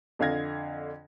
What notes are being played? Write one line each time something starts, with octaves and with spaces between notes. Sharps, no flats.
F2 D3 F5 G#6 A#6